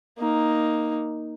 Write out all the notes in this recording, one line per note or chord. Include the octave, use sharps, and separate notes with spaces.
A#3 D#4